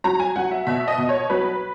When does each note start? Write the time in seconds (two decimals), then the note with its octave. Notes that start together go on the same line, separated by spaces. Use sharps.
0.04 F#3 A#5
0.20 G#5
0.36 F#3 F#5
0.51 E5
0.67 B2 E5
0.88 D#5
0.98 B2
1.09 C#5
1.30 F#3 B4